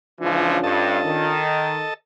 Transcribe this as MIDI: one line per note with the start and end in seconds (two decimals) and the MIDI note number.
0.21 0.58 37
0.21 0.58 52
0.21 0.58 53
0.21 1.40 61
0.21 1.40 62
0.21 1.40 65
0.63 0.99 43
0.63 1.94 69
0.63 1.94 75
0.63 1.94 81
1.06 1.84 51